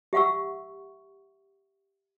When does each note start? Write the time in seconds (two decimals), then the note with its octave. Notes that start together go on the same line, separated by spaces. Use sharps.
0.13 G4 E5 F#5 C#6 E6